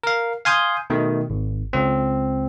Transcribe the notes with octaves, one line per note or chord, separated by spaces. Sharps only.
A#4 F5
F5 G#5 C6 D#6 G6
B2 D#3 A3
G#1
C#2 C4